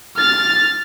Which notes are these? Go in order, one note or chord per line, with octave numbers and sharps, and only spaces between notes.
F6 A6